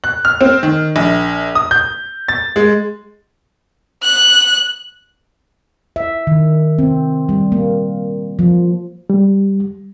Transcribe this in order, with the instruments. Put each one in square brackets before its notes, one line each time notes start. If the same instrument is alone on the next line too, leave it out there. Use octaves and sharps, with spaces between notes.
[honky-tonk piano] F#6
F6
C4
D#3
A#1
D#6
G6
A6
G#3
[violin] F#6
[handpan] E5
D#3
C4
G3
A#3
F3
[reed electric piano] G3